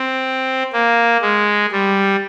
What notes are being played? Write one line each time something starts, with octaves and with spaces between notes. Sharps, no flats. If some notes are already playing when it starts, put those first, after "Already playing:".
Already playing: C4
A#3
G#3
G3